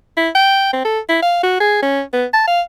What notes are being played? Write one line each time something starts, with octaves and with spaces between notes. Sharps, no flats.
E4
G5
C4
A4
E4
F5
F#4
G#4
C#4
B3
A5
F5